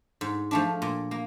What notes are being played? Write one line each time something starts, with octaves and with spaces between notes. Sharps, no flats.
G#2
F3 A3 D4
A#2
A#3